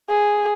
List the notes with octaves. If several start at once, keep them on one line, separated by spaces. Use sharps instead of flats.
G#4